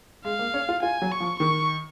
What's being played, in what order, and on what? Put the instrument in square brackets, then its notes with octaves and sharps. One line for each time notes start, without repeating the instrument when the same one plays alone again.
[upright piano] G#3 [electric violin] F5
[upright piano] A#3
C#4
F4
[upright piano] F4 [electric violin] G#5
[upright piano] F#3
[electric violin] C#6
[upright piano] F3
[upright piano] D#3 [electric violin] C#6